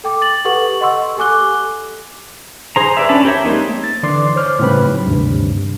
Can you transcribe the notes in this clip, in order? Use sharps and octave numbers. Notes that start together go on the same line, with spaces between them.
A4 G5 D6
A6 F#7
G4 A4 B4 F#5 C#6 F#7
D#5 F#5 C6 C#6 E6
G4 A4 G#5 D6 F#6 G7
G#4 C5 A#5
B4 D5 E5
C#4 D4 A5 B5
G4 A#4 C#5 E5
G#3 A#3 C4 D#4
A6
D3 E3 D5 C6 D6 C7
C5 C#5 D6 F6
A2 C#3 G3 C4 B4 B5
G#2 F#3
D2 G2 C3 D#3